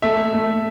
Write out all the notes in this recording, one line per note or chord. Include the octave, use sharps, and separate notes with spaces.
A3 E5
A3